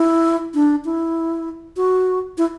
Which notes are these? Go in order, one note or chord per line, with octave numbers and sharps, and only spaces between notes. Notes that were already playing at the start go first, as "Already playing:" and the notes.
Already playing: E4
D4
E4
F#4
E4